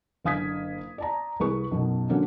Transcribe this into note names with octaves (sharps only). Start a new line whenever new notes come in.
F#1 D3 F5 D#6 G#6 B6
D5 A5 A#5
C2 G#4 B4 C#6
B1 F#2 B2
D3 F#3 A#3 C#4 D4